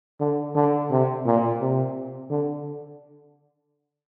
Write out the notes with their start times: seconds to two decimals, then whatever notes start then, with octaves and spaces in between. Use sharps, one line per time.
0.20 D3
0.56 D3
0.91 C3
1.26 A#2
1.61 C3
2.30 D3